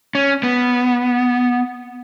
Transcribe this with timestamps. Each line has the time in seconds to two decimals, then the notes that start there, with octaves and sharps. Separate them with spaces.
0.15 C#4
0.43 B3